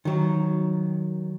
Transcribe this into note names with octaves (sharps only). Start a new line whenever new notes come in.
D#3 F#3